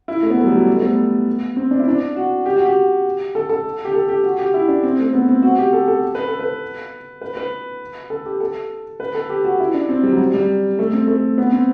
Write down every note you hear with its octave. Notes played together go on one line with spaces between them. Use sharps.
E4
A3
B3
A3
F#3
G3
F#3
G3
A3
B3
C4
D4
E4
D4
F#4
G4
F#4
G4
A4
A4
G4
A4
G4
F#4
G4
E4
D4
C4
A3
B3
C4
F#4
G4
A4
A4
B4
A4
B4
B4
B4
A4
G4
A4
B4
A4
G4
F#4
E4
D4
C4
G3
F#3
G3
G3
A3
C4
A3
B3
C4